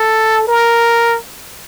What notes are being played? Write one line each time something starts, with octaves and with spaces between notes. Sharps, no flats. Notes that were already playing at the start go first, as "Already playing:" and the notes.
Already playing: A4
A#4